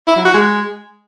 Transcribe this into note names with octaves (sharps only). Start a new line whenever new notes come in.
E4
F#3
F#4
G#3